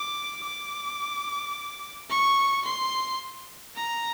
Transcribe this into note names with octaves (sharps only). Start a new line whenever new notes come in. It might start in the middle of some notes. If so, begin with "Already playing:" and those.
Already playing: D6
D6
C#6
C6
A#5